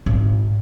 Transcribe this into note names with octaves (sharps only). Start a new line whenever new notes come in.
G#1